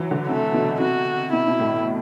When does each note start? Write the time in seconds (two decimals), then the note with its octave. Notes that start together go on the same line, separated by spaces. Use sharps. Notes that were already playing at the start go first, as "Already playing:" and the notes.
Already playing: E3 F#3
0.11 D3
0.28 C3 A3
0.54 B2
0.80 C3 F#4
1.33 B2 E4
1.48 B2
1.60 A2